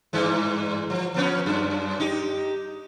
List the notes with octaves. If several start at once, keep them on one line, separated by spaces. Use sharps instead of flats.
G2 E3 G#3
F3
F3 B3 C#4
F#2
D#4 G4